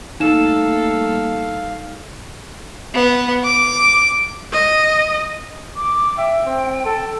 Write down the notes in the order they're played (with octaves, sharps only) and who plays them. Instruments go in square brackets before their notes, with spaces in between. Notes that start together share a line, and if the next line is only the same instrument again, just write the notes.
[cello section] G3 A3 A#3 [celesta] D#4 E7 [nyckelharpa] A4 [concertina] F5
[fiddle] B3
D6
[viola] D#5
[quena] D6
[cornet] E5 [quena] G5
[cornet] C4
A4